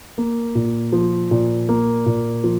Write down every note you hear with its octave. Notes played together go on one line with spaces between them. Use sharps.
A#3
A#2
F3
A#2
A#3
A#2
F3